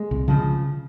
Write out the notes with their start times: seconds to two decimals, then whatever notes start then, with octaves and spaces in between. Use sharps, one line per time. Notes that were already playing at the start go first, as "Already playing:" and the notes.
Already playing: G#3
0.11 C2
0.28 C#3 F3